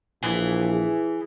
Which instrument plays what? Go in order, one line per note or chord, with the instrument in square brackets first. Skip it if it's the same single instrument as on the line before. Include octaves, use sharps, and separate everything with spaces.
[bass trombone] A#1 [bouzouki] E3 G#4